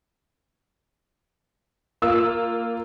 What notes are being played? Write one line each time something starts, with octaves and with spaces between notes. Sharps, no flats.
A#3 F4 E6